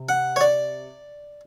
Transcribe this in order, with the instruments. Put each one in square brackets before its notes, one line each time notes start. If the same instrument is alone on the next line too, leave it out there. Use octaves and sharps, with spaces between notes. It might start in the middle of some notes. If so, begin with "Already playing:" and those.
Already playing: [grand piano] C3
[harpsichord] F#5
C#5
D5